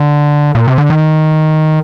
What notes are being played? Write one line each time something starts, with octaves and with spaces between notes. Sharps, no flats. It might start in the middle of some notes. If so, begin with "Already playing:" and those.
Already playing: D3
A#2
C3
D3
D#3